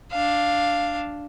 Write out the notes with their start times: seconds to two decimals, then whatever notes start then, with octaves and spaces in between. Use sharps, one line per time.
0.12 D4 F5